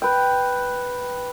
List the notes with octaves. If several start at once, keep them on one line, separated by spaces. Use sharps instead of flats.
B4 G5